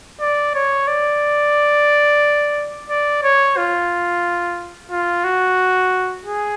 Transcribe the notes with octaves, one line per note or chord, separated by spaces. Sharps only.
D5
C#5
D5
D5
C#5
F4
F4
F#4
G#4